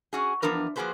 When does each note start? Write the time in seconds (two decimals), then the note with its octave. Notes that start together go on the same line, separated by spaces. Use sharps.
0.13 C#4 F#4 G#4
0.42 E2 F3 D4 A#4 B4
0.76 F3 A#3 F#4 G#4 B4 C5